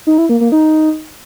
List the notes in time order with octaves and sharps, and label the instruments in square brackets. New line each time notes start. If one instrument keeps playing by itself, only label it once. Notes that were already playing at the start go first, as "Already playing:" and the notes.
[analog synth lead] D#4
E4
A#3
A#3
D#4